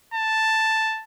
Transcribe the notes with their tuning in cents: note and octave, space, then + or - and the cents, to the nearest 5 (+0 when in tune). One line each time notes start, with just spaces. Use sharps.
A5 +5